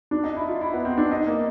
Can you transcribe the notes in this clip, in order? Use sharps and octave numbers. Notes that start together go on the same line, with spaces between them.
D4
D#4
E4
F4
E4
B3
C4
D4
D#4
A#3